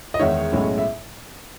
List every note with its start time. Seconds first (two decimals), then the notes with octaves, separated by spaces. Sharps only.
0.14 D#5
0.19 E2 D#3 G#3 D#4 C#5 E5
0.52 B1 A2 G#3 C#4 E4
0.78 E5